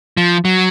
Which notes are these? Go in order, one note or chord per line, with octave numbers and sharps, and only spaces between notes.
F3
F#3